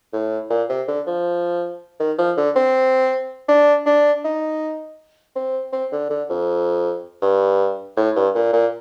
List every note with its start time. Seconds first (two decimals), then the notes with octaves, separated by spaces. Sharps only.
0.13 A2
0.50 A#2
0.69 C3
0.88 D3
1.07 F3
2.00 D#3
2.18 F3
2.37 D3
2.56 C4
3.49 D4
3.86 D4
4.24 D#4
5.36 C4
5.73 C4
5.92 D3
6.10 D3
6.29 F2
7.22 G2
7.97 A2
8.16 G2
8.35 A#2
8.53 A#2